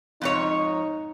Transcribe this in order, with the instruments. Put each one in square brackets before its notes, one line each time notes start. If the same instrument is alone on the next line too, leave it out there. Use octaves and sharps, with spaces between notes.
[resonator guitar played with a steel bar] F2 G#2 C#5 [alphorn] D#4